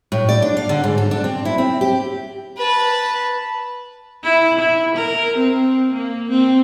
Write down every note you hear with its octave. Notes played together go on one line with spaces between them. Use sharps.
A2
D5
D4
F5
D3
G#2
A4
D4
C4
E4
C4
G4
B4 A5
E4
E4
A#4
C4
A#3
C4